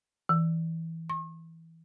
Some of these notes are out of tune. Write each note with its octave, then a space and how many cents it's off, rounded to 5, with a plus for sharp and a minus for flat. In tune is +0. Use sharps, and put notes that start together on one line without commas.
E3 -10
C#6 -45